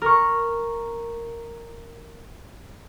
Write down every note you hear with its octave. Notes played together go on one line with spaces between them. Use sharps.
A#4 C#6